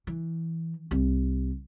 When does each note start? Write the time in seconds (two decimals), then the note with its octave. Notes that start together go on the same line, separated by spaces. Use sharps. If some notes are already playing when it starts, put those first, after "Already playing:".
0.07 E3
0.91 C2